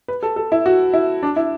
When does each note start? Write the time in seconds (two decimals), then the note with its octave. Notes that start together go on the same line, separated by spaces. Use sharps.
0.08 B4
0.23 A4
0.36 A4
0.52 E4
0.66 F#4
0.94 E4
1.23 D4
1.36 E4